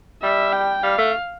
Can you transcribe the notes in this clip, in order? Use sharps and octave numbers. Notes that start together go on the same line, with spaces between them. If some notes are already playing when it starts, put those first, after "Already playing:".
G3 E5
G5
G3 F5
A3